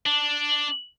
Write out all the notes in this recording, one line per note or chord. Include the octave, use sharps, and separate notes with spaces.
D4